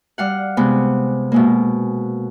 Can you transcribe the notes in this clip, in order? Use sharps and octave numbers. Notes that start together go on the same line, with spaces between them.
G3 F5 F#5
C3 G#3 B3
B2 G#3 A#3